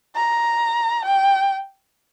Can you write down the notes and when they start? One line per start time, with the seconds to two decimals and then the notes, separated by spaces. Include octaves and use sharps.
0.16 A#5
1.05 G5